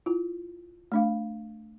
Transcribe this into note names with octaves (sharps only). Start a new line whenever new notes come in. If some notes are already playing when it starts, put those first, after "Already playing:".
E4 F4
A3 D4 F5